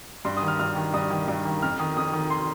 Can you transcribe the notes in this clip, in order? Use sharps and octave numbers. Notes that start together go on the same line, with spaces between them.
G2 C6
D#6
D#3
F6
G2 F6
D#3
G2 D#6
D#3
G2
D#3
F2 F6
D#3 D#6
F2 D#6
D#3
C6